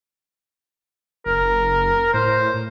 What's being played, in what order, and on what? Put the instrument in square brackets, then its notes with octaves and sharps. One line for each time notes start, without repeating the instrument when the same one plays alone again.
[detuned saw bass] F#1 [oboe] A#4
[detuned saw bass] A2 [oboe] C5